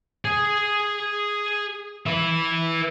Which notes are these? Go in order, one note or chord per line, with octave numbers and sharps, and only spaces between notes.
G#4 G#5
B4 E5